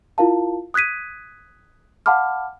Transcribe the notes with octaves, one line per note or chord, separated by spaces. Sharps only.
E4 F4 A#4 F5 A5
D#6 F#6 G#6 B6 D#7
F5 F#5 A5 B5 D6 F6